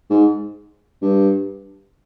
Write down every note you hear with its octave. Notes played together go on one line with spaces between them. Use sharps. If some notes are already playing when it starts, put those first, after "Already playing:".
G#2
G2